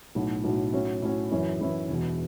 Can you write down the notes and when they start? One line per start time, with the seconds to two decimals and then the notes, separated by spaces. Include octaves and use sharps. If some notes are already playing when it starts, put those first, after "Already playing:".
0.15 B1 A2 F#3
0.44 B1 A2 F#3
0.73 A2 F#3 C#4 E4
1.02 A2 F#3 C#4 E4
1.32 F#2 E3 C#4 E4
1.61 F#2 E3 C#4 E4
1.89 E1 E2 B2